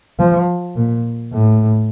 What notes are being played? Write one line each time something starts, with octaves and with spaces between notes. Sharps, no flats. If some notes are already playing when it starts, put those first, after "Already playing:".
F3
A#2
A2